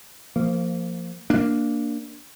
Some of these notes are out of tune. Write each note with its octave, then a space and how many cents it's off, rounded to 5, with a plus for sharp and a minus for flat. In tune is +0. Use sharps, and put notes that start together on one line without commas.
F3 +0 A#3 -25
A#3 +0 D4 +0